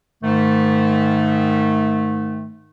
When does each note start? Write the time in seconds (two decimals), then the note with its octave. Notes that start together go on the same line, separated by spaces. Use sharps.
0.23 G#2 D#3 A3